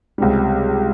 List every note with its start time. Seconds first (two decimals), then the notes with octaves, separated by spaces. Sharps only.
0.18 C#2 C3 G3